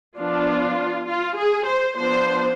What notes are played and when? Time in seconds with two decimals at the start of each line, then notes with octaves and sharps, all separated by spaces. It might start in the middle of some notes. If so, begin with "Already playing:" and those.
0.18 F3 B3 D4 F4
1.08 F4
1.37 G#4
1.67 C5
1.97 F3 B3 D4 C5